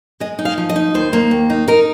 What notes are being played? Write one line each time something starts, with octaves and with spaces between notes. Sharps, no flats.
G#3 D#5
D#4
F5
F3
D#5
D#4
D#2 C5
A#3
D#2
D#4
D#4 A#4